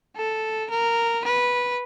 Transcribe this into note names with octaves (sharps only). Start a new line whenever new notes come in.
A4
A#4
B4